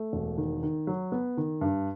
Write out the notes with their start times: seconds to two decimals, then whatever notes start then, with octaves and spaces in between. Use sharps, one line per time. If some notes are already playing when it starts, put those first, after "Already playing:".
Already playing: A3
0.13 E1
0.38 D#3
0.63 D#3
0.87 F#3
1.12 B3
1.37 D#3
1.61 G2